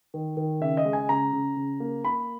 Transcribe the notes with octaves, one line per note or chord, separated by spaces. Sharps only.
D#3
D#3
C#3 E5
D#5
G#3
G#5
C#3 A#5
C#3
C#3
A#3
A#3 B5